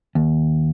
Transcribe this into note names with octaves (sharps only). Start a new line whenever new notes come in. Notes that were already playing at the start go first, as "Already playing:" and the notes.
D#2